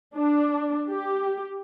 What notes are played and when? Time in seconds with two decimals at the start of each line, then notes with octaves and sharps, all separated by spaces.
0.15 D4
0.88 G4